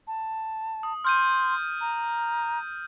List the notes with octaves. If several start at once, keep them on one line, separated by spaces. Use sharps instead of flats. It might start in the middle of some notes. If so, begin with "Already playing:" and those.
A5
D#6
C6 F6 G6 D#7
A#5